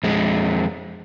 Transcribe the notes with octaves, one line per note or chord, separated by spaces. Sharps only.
F2 G#3